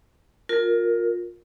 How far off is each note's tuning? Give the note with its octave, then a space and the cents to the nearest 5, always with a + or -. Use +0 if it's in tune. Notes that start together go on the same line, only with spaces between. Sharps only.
F4 +25 A#4 -5